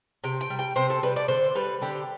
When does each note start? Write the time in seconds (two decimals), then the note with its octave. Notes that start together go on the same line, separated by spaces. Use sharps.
0.24 C3 G5
0.41 G5
0.50 G3
0.59 G5
0.76 C3 C5
0.90 A4
1.03 G3 B4
1.16 D5
1.28 D3 C5
1.55 G3 B4
1.82 D3 G4